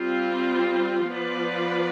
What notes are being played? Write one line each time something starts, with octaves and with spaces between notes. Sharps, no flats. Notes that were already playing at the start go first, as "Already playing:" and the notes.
Already playing: G3 C4 F4
F3 B3 F4 B4 D5